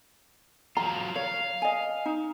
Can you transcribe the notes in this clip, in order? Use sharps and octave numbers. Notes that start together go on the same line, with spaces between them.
F#3 F4 A#5
C#5 F5
D#5 G#5
D#4